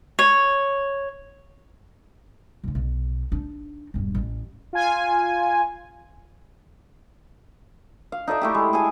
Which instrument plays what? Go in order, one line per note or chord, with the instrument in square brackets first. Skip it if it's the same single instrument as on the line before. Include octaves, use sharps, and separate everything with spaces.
[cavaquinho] C#5
[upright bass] E1 D3
B1
D4 D#4
E1 G2
A1
[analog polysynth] F4 G#5
[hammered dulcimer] F5
D#4 A4 D5 E5
A3 E4 G4
G#3
G#4 A4 G#5